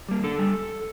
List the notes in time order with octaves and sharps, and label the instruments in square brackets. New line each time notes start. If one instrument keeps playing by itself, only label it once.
[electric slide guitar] G3 A#3
D3 A4
G3